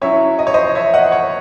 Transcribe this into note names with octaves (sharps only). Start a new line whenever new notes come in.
F#3 C#4 E4 C#5 E5
D#5
C#5
C5 D#5
C#5 E5
D#5 F#5
C#5